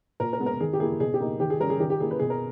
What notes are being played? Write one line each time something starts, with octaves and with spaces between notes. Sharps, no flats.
A#2 A#4
A#4
G#3 B3
A#4
D#3 G#4
G4
A#3 E4 G#4
B2 G#4
G4
A#3 D#4
D#3 G4
G#4
G3 C#4 A#4
G#4
D#3 G4
G4
A#3 E4 G#4
B4
B2 G#4
A#4